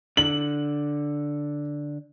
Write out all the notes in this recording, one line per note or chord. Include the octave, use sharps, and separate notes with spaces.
D3 F#7